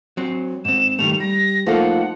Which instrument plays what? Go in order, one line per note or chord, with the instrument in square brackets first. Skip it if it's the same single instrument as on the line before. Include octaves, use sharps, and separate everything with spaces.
[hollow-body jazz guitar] F#3 C4
[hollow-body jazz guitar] G#2 C4 [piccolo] E7
[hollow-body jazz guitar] D#3 G3 A3 [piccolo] F7
[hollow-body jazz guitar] G3 [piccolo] A#6
[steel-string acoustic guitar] F3 F4 A4 [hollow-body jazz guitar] A3 A#3 D#4 [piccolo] F#5